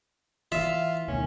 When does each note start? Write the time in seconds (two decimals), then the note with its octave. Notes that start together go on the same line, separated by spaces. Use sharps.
0.52 E3 F4 E5
1.08 D2 B2 D#3 C#4